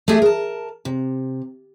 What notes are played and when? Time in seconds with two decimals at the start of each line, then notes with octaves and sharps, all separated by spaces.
0.08 A3 G4 G#4 E5 G#5
0.22 A#4 A5
0.85 C3